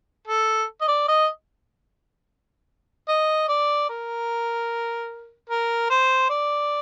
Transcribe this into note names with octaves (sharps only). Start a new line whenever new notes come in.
A4
D#5
D5
D#5
D#5
D5
A#4
A#4
C5
D5